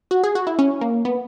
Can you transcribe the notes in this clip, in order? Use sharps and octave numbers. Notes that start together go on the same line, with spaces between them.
F#4
G#4
F#4
E4
C#4
A#3
B3